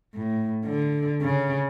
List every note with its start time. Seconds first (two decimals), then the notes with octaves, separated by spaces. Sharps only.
0.15 A2
0.65 D3
1.22 C#3